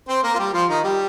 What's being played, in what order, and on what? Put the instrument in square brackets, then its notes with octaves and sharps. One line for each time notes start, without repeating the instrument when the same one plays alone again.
[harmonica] C4 C5
A#3 A#4
F4
G3 G4
F3 F4
D#3 D#4
G3 G4